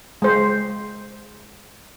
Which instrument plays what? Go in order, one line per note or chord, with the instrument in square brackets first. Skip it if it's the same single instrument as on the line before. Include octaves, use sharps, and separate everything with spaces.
[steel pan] G#3 C5